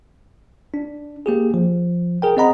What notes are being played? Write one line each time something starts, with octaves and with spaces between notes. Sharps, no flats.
D4
A#3 G4 G#4
F3
G#4 A#4 G5
C4 G#4 D#5 F#5 A#5 B5